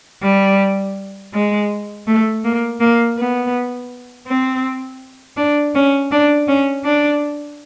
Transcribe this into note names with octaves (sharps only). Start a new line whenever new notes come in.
G3
G#3
A3
A#3
A#3
B3
C4
D4
C#4
D4
C#4
D4